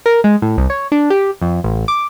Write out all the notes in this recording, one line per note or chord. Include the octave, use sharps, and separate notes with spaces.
A#4
G#3
A2
C2
C#5
D4
G4
F2
A1
D6